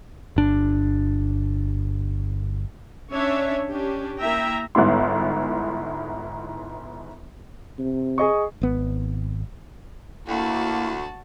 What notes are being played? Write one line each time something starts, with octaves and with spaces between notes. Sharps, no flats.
G1 D4
C#4 D4 C#5 E5
C#4 D4 G4
A#3 E4 E5 G5 A#5
G1 G#2 B3 E4 C6
C3
G#4 D#5 C#6
G#1 B3
D2 A#3 E4 F#4 A5